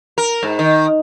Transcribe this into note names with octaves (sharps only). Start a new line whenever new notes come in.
A#4
G#2
D#3